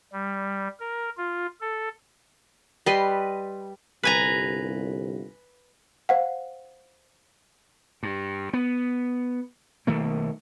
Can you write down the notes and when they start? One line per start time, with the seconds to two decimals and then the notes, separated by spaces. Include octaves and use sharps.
0.12 G3
0.80 A#4
1.17 F4
1.61 A4
2.86 G3 B4 D#5 C6
4.03 G1 C2 B4 G#5 A#5
6.09 C5 F5 F#5
8.03 G2
8.53 B3
9.87 B1 D#3 A3 A#3